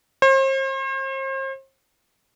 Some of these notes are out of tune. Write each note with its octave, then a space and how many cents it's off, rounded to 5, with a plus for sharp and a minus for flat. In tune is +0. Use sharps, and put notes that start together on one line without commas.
C5 +40